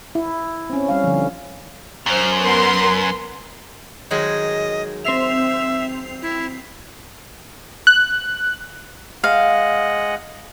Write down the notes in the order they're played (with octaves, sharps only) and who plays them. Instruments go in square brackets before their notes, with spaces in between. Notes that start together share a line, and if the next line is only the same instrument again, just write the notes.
[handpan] E4
C4 C#4
G3 C#4 F5
D3 F3
[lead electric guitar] F#2 [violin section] C5 F6
[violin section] B3 A#4 C6
[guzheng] D#3 F#3 G#3 [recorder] D#5
[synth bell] C4 C7 F7 [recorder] E5
[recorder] E4
[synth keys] F#6
[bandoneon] G#3 D#5 F#5 [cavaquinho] F5